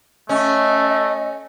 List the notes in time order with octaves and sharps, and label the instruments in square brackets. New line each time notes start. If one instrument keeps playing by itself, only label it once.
[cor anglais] A3 [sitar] C#4 [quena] D#5